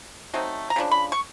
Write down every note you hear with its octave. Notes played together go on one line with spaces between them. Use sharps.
F#3 A3 C4 D#4
A#5
C#3 F3 D4
B5
C#6